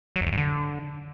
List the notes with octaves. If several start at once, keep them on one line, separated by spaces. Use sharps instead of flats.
F#3
F2
E2
G2
D3